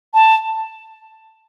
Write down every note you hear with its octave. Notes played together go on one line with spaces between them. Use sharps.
A5